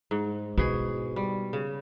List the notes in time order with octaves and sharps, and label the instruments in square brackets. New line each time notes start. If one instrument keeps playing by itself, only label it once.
[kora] G#2
[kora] B2 G#4 [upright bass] E4
[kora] G3
C#3